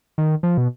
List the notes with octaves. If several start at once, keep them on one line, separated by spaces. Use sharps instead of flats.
D#3
F3
B2